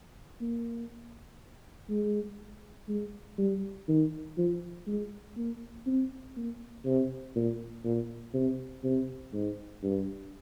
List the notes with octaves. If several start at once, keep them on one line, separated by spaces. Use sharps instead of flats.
A#3
G#3
G#3
G3
D#3
F3
G#3
A#3
C4
A#3
C3
A#2
A#2
C3
C3
G#2
G2